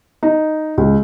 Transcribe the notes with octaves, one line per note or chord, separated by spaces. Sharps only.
D#4
C#2